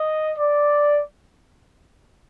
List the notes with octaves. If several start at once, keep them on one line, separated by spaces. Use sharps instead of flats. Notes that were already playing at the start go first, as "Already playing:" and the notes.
Already playing: D#5
D5